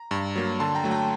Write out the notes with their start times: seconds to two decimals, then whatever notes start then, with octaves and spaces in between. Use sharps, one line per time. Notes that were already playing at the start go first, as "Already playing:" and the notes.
Already playing: A#5
0.11 G2
0.36 F#3 A#3
0.60 D3 A5 C6
0.75 G5 A#5
0.84 F#3 A3
0.91 G5 A#5